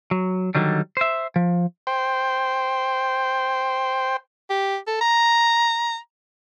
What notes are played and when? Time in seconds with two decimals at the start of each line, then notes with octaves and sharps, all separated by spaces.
0.11 F#3
0.55 D3 D#3 F#3 G3
0.97 C5 E5
1.36 F3
1.87 C5 G5
4.50 G4
4.87 A4
5.01 A#5